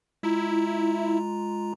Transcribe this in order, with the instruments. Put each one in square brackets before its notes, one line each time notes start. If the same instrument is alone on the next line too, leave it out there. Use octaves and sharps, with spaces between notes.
[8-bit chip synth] G#3 F4 A#5 [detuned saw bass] E4